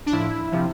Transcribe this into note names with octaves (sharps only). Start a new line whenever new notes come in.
D4
A2 F3 E4
C3 F3